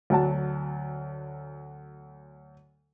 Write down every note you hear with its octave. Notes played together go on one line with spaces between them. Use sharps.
D2 F#3 F#5 A5